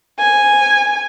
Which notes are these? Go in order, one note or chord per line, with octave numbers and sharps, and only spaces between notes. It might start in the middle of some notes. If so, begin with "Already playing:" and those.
G#5